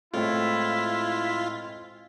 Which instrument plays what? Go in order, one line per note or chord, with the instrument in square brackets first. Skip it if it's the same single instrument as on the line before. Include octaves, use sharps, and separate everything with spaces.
[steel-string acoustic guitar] A2 [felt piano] G#3 C4 A4 [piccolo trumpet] E4 [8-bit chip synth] F4